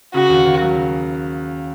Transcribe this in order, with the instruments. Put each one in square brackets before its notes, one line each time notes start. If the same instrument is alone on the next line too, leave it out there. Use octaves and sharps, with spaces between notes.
[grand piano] C#3 [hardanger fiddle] F#4
[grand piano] D#2
D#2
F#3
C#3